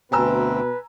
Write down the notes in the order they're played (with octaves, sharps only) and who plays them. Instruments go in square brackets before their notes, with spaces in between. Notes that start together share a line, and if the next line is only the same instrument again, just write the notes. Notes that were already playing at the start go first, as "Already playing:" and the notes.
[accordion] D2 C4 [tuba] B2 [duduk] B4 [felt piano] G#5 A#5 E6